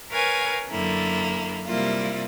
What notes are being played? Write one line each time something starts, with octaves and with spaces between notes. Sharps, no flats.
A#4 B4 C#5 F5 G#5
F#2 D3 A#3 E4
C3 G3 A#3 E4 F4